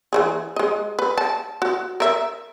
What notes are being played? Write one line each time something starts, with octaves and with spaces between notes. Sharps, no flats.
E3 G3 G#4
G#3 D#5
B4
A5
F#4
A#4 E5